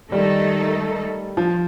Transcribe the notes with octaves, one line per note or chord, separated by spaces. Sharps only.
D#3 G3 A3 D#4 A4
F3